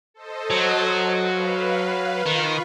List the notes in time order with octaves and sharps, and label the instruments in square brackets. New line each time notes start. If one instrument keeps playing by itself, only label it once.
[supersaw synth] A4 C5 D#5
[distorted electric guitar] F#3
[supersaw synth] B4 F5
[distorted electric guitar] D#3 [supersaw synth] F4 B5 C#6